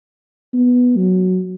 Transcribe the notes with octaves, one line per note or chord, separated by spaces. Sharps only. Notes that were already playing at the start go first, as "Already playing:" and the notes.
B3
F#3